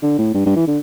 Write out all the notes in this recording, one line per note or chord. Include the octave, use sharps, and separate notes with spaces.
D3
A2
G2
G2
E3
D3